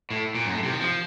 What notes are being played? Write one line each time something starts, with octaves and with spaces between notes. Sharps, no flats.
A2
A#2
F#2
A2
C3
D#3
F3